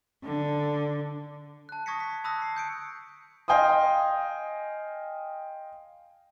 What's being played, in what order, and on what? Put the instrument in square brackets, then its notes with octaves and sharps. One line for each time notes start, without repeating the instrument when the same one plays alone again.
[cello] D3
[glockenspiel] A5 F#6
C#6 D#6 G#6 A#6 B6 C#7
B6
A5 B5 D#6 E6 F#6 A#6
C7
D#6 G6 C#7 D7
[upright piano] D#5 F5 G5 G#5 C6 D#6